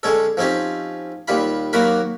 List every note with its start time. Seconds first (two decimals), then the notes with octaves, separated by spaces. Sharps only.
0.03 D3 G#3 C#4 A4
0.37 F3 C4 C#4 D#4 G4
1.28 D#2 G3 F4 B5
1.73 D#2 F#3 A#3 F#4 A#4 B5